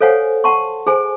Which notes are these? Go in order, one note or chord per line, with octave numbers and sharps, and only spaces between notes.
A4 C5 C#5 F5 F#5 G#5
F#5 A5 C6 C#6
G#4 C5 G#5